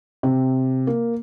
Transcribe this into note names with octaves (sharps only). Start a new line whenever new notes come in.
C3
A#3